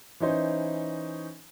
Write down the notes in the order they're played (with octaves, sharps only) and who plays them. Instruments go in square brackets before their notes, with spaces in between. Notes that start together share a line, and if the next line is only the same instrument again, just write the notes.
[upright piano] E3 C#4 D#4 C5